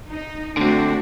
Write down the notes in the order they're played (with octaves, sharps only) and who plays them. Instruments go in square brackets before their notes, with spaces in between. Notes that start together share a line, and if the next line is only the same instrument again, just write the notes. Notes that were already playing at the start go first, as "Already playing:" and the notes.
[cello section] D#4
[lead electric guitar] D3 C4 [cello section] A3 D4 F#4